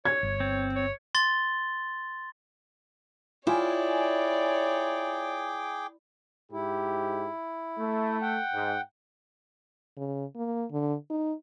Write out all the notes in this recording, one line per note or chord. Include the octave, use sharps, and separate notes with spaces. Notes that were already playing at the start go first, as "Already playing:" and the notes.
C#5 G#6
G1
C4
C#5
C6 A6 G7
E4 F4 G#4 C#5 D5 G5 G#5 D6
G#2 E4 G4
A3
F#5 G5
G#2
C#3
A#3
D3
D#4